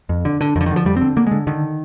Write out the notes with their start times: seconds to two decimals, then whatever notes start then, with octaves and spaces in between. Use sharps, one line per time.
0.09 F2
0.25 D3
0.41 D3
0.56 F2 D#3
0.61 D3
0.66 D#3
0.71 D3
0.76 F3
0.85 F2 G3
0.96 D3 C4
1.17 D3 A#3
1.27 D3 G#3
1.47 D3 D#3